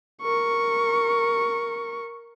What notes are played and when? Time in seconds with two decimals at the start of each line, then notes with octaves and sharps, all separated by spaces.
0.22 A#4 C#6